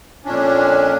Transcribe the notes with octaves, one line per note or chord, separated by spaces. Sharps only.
F2 A#2 C#4 D4